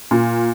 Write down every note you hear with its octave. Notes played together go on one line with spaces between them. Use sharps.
A#2